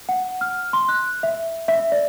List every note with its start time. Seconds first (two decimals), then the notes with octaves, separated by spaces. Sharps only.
0.09 F#5
0.41 F6
0.73 C6
0.88 F#6
1.23 E5
1.68 E5
1.92 D5